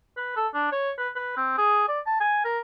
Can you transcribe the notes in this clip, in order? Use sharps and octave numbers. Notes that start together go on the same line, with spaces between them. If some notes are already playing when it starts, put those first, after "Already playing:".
B4
A4
D4
C#5
B4
B4
C4
G#4
D5
A5
G#5
A#4